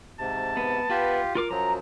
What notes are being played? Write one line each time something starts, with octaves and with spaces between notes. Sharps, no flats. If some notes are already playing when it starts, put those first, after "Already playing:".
G#2 C3 A5
B3
B3 F4 G4 B4
F4 A#4 D6
F#2 F3 F#3 A#5